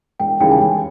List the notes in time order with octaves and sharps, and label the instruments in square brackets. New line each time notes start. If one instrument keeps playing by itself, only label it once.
[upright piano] E1 [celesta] G5
[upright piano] D#2 C#3 E3 G3 [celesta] G5
[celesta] G#5
[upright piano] E1 [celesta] G5